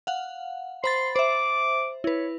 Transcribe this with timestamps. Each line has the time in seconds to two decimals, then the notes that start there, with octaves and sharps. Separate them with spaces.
0.07 F5 F#5
0.84 C5 B5 C6 A6
1.16 C5 E5 D6
2.04 E4 B4 C#5